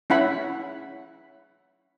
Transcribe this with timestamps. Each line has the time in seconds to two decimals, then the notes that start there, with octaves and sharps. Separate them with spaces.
0.10 C#4 E4 F#5 B5